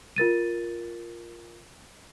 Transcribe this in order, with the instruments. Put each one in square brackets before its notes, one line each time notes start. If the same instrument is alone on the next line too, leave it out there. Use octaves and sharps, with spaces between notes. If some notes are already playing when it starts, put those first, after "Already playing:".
[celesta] F4 A#4 A6 D#7